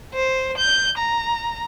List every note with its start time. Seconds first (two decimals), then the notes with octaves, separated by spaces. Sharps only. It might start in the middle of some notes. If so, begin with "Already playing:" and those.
0.13 C5
0.58 G6
0.97 A#5